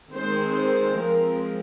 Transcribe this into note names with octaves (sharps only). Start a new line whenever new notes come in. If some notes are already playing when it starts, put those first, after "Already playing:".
D#3 G#3 C4 C5
C5
F3 G#3 C4 A#4